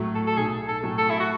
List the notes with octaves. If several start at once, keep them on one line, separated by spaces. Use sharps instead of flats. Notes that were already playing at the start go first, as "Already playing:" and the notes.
Already playing: A2 F#3 A3
A4
A4
B1 G#4
A4
A2 F#3 A3
A4
E4
F#4